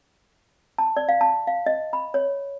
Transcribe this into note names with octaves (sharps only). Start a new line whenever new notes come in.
A5
D5
F5
A5
F5
D#5
B5
C#5